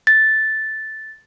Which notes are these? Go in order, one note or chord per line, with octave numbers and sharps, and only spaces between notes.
A6